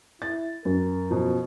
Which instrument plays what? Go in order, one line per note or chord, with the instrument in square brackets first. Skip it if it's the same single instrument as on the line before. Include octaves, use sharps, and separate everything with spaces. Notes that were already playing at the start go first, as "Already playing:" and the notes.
[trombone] E4 [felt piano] A6
[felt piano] F#2 [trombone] A#4
[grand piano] B2 F3